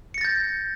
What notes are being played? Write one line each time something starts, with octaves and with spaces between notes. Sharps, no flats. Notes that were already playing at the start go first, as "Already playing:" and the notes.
G6 A6 A#6 C#7